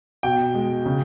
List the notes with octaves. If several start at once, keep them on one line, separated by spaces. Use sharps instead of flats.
B2 G5
G#3
C#3